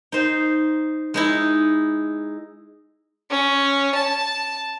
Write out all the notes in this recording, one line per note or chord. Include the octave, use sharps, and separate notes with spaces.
D#4 C5
G#3 D#4 E4
C#4
A5